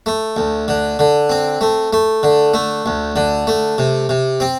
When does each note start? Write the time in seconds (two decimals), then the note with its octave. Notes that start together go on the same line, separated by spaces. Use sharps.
0.06 A3
0.37 D2
0.68 D3
0.99 D3
1.30 C4
1.61 A3
1.93 A3
2.23 D3
2.54 A3
2.86 D2
3.16 D3
3.47 A3
3.78 C3
4.09 C3
4.40 C4